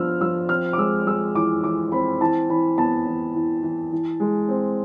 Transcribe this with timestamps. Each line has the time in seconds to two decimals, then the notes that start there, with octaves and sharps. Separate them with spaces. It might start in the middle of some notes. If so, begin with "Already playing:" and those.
Already playing: F3 B3 D4 E6 F6
0.21 F3 E6
0.49 C4 F6
0.73 D6
0.78 G#3 E6
1.07 G#3 E6
1.35 E3 D6
1.63 E3 D6
1.92 C4 B5
2.21 E3 A5
2.49 E3 B5
2.78 B3 A5
3.07 E3
3.35 E3
3.63 E3
3.92 E3
4.20 G#3
4.48 C4